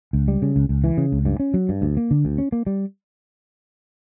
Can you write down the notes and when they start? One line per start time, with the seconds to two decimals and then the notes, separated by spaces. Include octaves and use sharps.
0.13 C#2
0.28 G3
0.42 C#3
0.56 C#2
0.69 C#2
0.84 E3
0.97 C#3
1.12 C#2
1.25 G2
1.40 C#4
1.54 F#3
1.69 G2
1.82 D2
1.97 A#3
2.11 D3
2.25 D2
2.38 C#4
2.52 A#3
2.67 G3